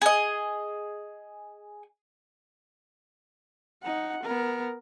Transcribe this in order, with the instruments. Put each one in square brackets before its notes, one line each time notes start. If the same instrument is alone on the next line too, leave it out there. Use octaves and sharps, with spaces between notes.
[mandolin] G#4 D#5
[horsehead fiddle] D#4 F#5
B3 A#4